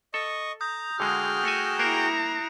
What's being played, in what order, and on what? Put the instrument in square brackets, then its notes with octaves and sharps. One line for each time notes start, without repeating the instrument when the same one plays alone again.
[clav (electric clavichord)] A4 [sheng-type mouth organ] D#5 C#6
[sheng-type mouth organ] A#5 [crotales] D#6 G6
[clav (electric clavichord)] D3 G#3 [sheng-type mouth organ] F#4 G#4 G5 [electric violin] F6
[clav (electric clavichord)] A3 G#5 [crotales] A#6 C#7 E7
[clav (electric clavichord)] A#3 A#4 [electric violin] E4 A#5 [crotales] F#6 C7 D7